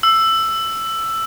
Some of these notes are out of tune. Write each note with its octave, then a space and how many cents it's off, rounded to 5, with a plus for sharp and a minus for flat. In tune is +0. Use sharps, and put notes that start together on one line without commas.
E6 +10